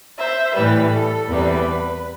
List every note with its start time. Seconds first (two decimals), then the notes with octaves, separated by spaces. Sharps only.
0.19 C5 E5
0.56 A2 E3 G3 B4
0.94 A4
1.29 E2 C3 G3 B4